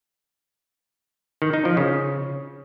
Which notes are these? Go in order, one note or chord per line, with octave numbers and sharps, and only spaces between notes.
D#3
D#4
F3
C#3